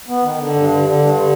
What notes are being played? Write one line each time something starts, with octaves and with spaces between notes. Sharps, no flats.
B3
D#3
D3
G2
D3
D3
G2
D3